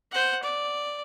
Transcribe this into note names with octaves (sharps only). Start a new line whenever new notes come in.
C5 F#5
D5